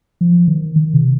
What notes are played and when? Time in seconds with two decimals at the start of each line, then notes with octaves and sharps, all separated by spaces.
0.21 F3
0.48 D#3
0.76 D#3
0.94 C3